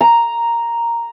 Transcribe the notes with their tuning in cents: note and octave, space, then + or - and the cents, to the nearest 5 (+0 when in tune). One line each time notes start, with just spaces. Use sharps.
A#5 +0